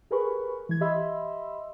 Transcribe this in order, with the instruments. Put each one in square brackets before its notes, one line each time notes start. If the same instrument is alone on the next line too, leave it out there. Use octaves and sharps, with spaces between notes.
[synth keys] G4 G#4 A#4 B4 B5 C#6
E3 G#6
G4 D#5 E5 B5 C6 E6